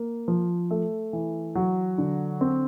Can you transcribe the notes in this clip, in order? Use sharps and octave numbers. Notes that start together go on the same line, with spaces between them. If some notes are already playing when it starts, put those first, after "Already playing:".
Already playing: A#3
F3
A3
E3
F#3
D3
C4